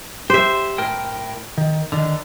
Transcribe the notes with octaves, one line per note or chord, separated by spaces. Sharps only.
G4 C5 E5
A2 A#4 G5
D#3
D3 D#3